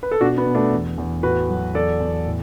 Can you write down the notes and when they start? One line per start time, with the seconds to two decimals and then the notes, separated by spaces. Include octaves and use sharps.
0.03 B4
0.11 A4
0.21 B2 D4 F#4
0.38 B3
0.46 B2
0.55 A3 D4
0.72 E2
0.98 E2
1.23 A2 F#4 B4
1.49 F#3
1.74 E2 A4 D5
2.00 E2
2.26 A2